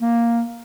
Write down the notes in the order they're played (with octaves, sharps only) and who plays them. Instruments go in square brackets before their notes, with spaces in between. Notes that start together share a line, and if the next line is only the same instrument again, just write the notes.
[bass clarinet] A#3